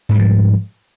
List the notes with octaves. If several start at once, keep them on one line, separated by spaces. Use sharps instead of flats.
G#2 F3 G3